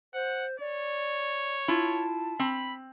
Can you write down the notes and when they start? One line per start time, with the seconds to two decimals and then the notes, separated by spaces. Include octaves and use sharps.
0.14 C5 F#5
0.60 C#5 D5
1.68 E4 F4 A5
2.39 C4 B5